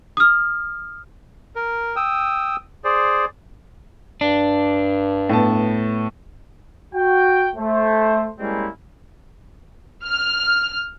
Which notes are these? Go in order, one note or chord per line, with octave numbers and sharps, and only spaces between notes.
D#6 F6
A#4
G5 D#6 E6
G#4 C5 D5
G2 D4
A2 B3 A5
F#4 G5
A3 C5
G3 G#3 A#3 C4 C#4 E4
F6